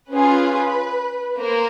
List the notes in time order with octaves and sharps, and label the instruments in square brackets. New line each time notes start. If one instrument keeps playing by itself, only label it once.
[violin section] C#4 F4 G#4 B4
A#3 A#4 C5